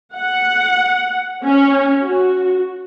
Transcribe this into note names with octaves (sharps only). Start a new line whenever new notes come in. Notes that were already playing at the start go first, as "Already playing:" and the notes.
F#5
C#4
F#4